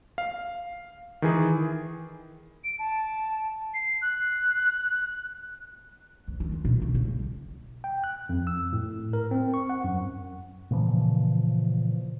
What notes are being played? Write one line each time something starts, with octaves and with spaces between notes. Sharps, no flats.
F5
D#3 E3 G#4
D7
A5
C7
F#6
D2
D#3
F4
B2
D#3
C#3
G3
G5
F#6
F2
E6
A2
A#4
C4
C#6
F#5
F#2
A#2 C#3 E3 F3